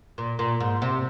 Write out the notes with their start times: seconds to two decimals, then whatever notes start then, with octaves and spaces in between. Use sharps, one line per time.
0.18 A#2
0.39 A#2
0.60 G#2
0.82 C3